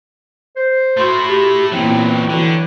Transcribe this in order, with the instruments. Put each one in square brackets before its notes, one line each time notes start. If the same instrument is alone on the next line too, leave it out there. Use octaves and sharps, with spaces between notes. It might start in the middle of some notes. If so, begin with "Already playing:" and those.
[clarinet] C5
[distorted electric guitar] A3 E4 [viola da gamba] F#4 [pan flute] C6
[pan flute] G4 [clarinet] G#4
[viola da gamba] A#2 B3 C4 [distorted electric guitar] E3 F#3 [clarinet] E4 [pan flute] G5
[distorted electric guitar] D3 [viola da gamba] E3 F#3 C#5